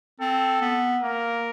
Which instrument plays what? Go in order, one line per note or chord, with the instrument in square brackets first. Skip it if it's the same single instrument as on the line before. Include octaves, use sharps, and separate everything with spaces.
[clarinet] C4 [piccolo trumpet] A4
[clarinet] B3
[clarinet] A#3 [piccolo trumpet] A#4